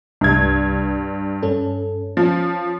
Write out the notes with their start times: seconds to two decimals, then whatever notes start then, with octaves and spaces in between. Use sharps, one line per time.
0.21 C2 G2 G#6
1.43 G2 C#4 A4
2.17 F3 C#4